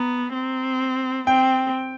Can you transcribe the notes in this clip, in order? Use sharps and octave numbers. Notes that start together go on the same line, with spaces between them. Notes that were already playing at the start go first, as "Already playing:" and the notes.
Already playing: B3 A#5
C4
C4 G5